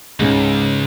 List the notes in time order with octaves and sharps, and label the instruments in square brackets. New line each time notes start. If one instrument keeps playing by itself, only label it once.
[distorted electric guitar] C#2 [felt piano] G#2 C#3 C#4